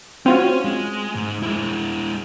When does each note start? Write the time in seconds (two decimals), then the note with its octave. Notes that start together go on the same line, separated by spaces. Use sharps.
0.26 C4 C#4 F4 F#4
0.65 G#3
1.15 G#2
1.43 G#3 E4